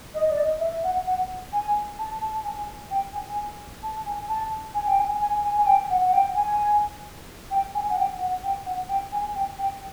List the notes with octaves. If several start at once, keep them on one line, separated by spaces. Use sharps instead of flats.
D#5
D5
D#5
E5
F#5
F#5
G#5
A5
A5
G#5
G5
G#5
A5
G#5
A5
G#5
G5
G#5
G#5
G#5
G#5
G5
F#5
F#5
G5
G#5
G5
G#5
F#5
G5
F#5
G5
F#5
G5
G#5
G5
G5